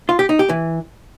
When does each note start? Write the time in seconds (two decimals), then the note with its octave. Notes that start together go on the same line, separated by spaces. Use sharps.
0.09 F4
0.19 G4
0.29 D#4
0.39 G4
0.49 E3